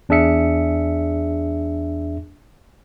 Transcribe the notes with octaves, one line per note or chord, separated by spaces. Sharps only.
E2 D4 G#4 E5 C#7